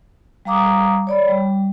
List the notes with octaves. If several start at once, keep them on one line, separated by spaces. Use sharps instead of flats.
G3 F5 A#5 D6 D#6
C#5 D5 B5
G3